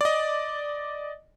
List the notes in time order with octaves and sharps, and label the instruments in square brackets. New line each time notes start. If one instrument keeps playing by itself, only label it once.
[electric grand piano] D5 D#5